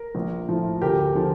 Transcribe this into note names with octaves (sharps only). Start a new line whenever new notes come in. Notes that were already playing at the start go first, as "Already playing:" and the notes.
Already playing: A#4
A#1
A2 F3
D2 G4 A#4
D3 F3